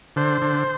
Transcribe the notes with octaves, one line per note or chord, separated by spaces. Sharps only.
D3 C5
D3